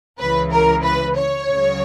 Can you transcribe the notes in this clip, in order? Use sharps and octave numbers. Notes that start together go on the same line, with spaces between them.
C#2 C#3 E3 B4
A#4
B4
C#5
C#2 C#3 F#3